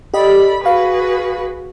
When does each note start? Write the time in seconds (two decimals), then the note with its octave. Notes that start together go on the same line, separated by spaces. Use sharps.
0.14 G4 A4 D5 D#5 B5
0.61 F#4 G#4 B4 F5 B5